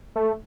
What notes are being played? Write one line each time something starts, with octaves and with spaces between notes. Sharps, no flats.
A3